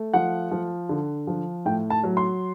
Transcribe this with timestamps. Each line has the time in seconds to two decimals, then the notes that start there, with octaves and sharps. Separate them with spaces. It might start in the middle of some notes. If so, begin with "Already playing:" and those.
Already playing: A3
0.14 F3 F#5
0.51 F3
0.89 D3
1.27 F3
1.65 A2 G5
1.90 A5
2.04 F#3
2.17 C6